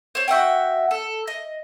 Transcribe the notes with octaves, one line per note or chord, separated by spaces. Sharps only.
C5 C#5
F#4 E5 F#5 G5
A4
D#5